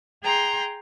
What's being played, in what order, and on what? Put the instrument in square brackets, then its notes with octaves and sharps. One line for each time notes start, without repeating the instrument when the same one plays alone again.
[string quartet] G#4 G5 A#5 C6